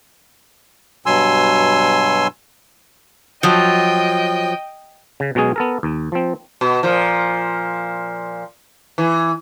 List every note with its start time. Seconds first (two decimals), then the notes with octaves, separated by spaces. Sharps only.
1.06 G2 B2 F#3 G#5 C6 E6
3.43 F3 F#3 D#5 G5
5.20 C#3
5.35 B2 F#3 G#3 C#4 G#4
5.56 B3 A4 A#4
5.83 D#2
6.12 F3 C4
6.61 B2
6.83 A#2 F3
8.98 E3